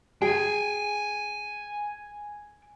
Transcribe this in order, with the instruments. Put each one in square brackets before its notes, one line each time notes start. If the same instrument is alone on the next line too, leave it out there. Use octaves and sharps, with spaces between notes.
[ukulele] G#4 [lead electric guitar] G5 G#5